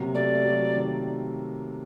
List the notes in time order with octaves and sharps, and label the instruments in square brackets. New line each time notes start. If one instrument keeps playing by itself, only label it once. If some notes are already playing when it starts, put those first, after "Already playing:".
Already playing: [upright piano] C3 F#3 A#3
[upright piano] A3 [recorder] D5
[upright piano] F#3
D#3